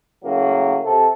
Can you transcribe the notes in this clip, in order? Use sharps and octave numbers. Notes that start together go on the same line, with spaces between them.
A2 C#3 F#3 A#3
C3 A4